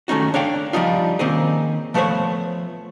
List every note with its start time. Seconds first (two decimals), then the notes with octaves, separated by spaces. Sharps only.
0.08 D#3 A3 C#4 D#4 F#4
0.34 D4 C#5 F5 G5
0.73 F3 G3 C#4 D#4 F4
1.19 D#3 A#3 C4 C#4 D#4 G#4
1.94 F3 A3 B3 A#4 C5 C#5